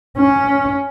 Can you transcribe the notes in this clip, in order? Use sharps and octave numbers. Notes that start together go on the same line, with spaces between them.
C#4